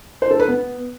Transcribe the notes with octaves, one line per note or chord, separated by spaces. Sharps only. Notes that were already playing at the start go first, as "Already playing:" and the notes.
C5
A4
B4
B3